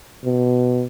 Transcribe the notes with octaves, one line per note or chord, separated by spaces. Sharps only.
B2